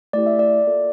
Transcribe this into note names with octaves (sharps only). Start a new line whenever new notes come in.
A3 E4 G4 D5
E5
D5
A#3 F4 A4